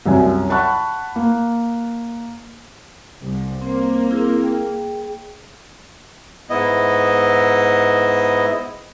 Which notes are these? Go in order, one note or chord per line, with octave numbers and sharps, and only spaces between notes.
C2 F#2 G#5
F#5 A5 B5 C#6 F#6
A#3
C2
A#3 C4 C5
C4 E4 G#4
G#4 G5
G#2 B3 E4 D#5